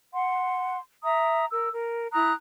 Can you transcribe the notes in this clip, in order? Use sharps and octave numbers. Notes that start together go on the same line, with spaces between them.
F#5 C6
E5 A#5 D#6
A#4 E6
A#4
E4 A#5 D#6 F#6